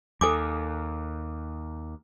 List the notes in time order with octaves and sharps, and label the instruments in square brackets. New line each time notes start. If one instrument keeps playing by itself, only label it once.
[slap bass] D#2 [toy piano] A4 G#5 D6